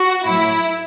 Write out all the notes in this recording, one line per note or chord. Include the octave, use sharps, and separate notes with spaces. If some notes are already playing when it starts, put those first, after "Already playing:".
Already playing: F#4
A2 F#3 E4